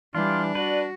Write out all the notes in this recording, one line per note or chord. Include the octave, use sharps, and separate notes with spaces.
E3 G3 D4 F4 G4
F#4 B4 D5